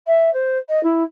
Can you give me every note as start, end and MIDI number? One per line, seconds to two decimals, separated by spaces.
0.07 0.32 76
0.33 0.57 72
0.68 0.81 75
0.83 1.03 64